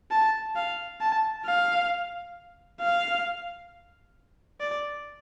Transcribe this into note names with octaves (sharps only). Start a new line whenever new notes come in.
A5
F5
A5
F5
F5
D5